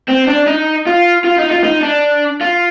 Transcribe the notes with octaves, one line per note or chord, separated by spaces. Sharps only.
C4
D4
D#4
F4
F4
D#4
F4
D#4
D4
F4